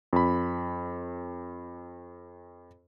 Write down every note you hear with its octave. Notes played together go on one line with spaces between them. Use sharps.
F2 B5